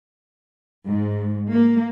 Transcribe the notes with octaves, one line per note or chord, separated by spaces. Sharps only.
G#2
A#3